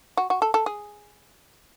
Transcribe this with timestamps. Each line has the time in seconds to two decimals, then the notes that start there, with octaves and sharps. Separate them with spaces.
0.17 F#4
0.30 F#4
0.42 A4
0.54 A4
0.66 G#4